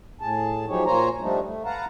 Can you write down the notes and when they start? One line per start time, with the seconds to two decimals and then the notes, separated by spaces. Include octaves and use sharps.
0.21 A2 G#4 A5
0.68 F3 F#3 D#4 G4 G#4 C#5
0.85 A#2 A#3 C5 C#5 G#5 A#5
1.21 F3 G3 A3 D4 D#4
1.43 A3
1.65 B4 F5 F#5 A5 A#5